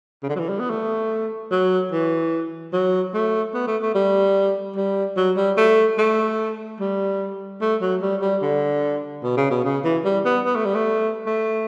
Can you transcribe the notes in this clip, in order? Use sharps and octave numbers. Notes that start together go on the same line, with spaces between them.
C#3
D3
F#3
E3
G3
B3
A3
F#3
E3
F#3
A3
B3
A3
A3
G3
G3
F#3
G3
A3
A3
G3
A3
F#3
G3
G3
D3
B2
C#3
B2
C#3
E3
G3
B3
B3
A3
G3
A3
A3